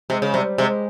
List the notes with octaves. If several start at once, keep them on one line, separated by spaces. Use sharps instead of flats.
C3 G#3
C#3
C3 G3
C3 G#3